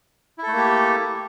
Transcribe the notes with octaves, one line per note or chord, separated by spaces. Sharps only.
A3 A#3 E4 G4 A4